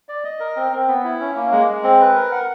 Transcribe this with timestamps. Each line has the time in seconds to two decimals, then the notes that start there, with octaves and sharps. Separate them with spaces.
0.09 D5
0.24 D#5
0.40 A#4
0.56 C4
0.72 C4
0.88 B3
1.04 E4
1.20 C#4
1.36 A#3
1.52 G#3
1.68 G#3
1.84 C4
2.00 B4
2.16 A#4
2.32 F#5